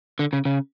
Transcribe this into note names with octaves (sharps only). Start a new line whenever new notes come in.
D3
C#3
C#3